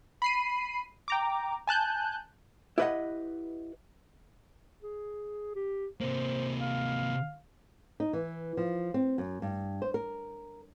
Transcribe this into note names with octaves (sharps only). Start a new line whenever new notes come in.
B5 C7 D#7
G5 A#5 D6
G#5 A5 F#6 G6
E4 G4 B4 C5 D#5 F#5
G#4
G4
C3 A#3 C5
F5
D#4
E3
F3
C4
F#2
G2
C5
A#4